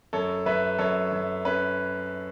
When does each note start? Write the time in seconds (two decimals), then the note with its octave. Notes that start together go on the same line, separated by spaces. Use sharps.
0.13 F#2 A4 C#5
0.46 F#2 B4 E5
0.79 F#2 A4 C#5
1.12 F#2
1.45 C#4 B4